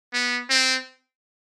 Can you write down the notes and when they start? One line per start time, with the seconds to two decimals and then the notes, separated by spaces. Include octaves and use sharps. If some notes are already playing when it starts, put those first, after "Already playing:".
0.13 B3
0.50 C4